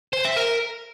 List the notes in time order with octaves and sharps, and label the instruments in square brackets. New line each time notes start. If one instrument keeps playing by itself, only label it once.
[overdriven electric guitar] C5
E5
A#4